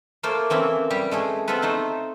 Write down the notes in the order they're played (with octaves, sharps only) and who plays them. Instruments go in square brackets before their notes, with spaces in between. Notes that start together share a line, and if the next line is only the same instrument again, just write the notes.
[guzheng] A3 A#3 F4 C5
E3 C4 C#4 E4
G3 G4
G#3 A3 G#4
B3 C4 F4 A4 B4
A3 D#4 C5